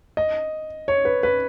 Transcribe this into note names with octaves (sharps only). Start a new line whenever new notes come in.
D#5
C#5
B4
B4